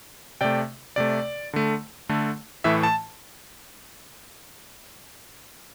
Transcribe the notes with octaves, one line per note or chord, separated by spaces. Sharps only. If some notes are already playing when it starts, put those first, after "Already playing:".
C3 A3 D5 G5
C3 A3 D5
D3 A3
D3 A3
A2 E3 A3 E5
A5